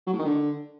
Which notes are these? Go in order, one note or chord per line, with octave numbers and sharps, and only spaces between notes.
F#3
A2
D#3
D3